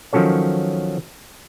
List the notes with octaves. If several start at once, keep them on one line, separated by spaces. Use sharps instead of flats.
D#3 F3 F#3 C#4 A4 C#5